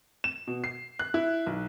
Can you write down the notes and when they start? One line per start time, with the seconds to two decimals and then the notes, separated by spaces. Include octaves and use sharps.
0.24 E7
0.47 B2
0.64 C7
0.99 F#6
1.14 E4
1.46 B1